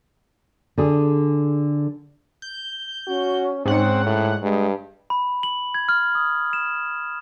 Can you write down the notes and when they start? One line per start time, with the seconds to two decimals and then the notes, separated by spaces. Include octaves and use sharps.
0.78 D3 G#4
2.42 G6
3.07 C#4 F#4
3.66 G#2 C4 C#4 F#5
4.06 A2
4.42 G2 G#3
5.10 B5
5.43 F#7
5.74 G#6
5.89 F6
6.15 D#6
6.53 E7